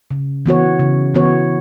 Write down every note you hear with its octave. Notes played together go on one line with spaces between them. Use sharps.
C#3
E3 B3 F#4 C#5
C#3
E3 B3 F#4 C#5